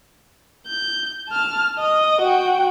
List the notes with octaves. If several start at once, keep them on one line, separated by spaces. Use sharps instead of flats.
G6
A5 F6
D#5
F#4 G5